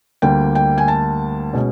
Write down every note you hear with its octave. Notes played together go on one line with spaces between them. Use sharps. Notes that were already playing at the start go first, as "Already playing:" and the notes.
D2 D3 G3 A#3 G5
G5
G#5
A5
B2 G#3 C#4